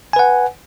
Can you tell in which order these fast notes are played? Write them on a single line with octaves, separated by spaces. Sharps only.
G#5 B4 F#5